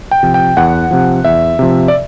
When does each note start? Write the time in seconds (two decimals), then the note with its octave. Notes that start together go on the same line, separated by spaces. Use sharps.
0.11 G5
0.23 C3 F3
0.34 G5
0.57 E2 F#5
0.91 C3 F3
1.24 E2 E5
1.59 C3 F3
1.88 D5